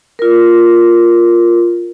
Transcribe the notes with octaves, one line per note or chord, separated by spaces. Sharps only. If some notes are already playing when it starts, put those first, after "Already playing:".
F4 A#4